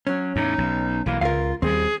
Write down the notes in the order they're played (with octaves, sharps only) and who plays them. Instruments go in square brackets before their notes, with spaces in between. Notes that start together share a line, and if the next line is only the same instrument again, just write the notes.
[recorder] F#3 [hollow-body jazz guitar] C#4
[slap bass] E2 A2 [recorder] D#4
[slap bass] B1
[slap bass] B1 E3 [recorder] A#3
[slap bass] C#2 [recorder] F4 [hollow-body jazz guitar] A#4 F5
[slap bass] D#2 G3 [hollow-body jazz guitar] C4 [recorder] G#4